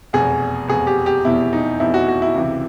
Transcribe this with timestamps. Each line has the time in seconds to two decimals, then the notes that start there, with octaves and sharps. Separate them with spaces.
0.13 F1 E2 B2 G#4
0.68 F1 E2 B2 G#4
0.87 G4
1.06 G4
1.25 F1 E2 B2 E4
1.53 D#4
1.80 F1 E2 B2 E4
1.94 F#4
2.08 F#4
2.22 E4
2.35 C#2 C3 E3